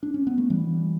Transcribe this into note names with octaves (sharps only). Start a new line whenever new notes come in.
D4
C#4
B3
A3
E3 G3